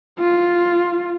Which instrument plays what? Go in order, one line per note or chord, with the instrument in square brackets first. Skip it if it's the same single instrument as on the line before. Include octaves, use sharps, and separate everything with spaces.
[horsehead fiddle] F4